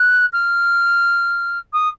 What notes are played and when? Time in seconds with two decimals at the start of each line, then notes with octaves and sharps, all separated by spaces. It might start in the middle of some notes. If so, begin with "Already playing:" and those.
Already playing: F#6
0.32 F6
1.73 D#6